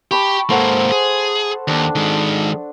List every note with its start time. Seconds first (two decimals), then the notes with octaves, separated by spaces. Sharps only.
0.11 G4 A5 B5 C#6
0.50 G#2 A#3 A4 C5 F#5
0.92 G#4
1.68 D#2 D4
1.95 D#3 G#3